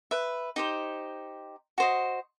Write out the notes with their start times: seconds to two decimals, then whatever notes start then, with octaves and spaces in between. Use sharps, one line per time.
0.11 B4 E5
0.56 D#4 G4 C5
1.78 F#4 C5 D#5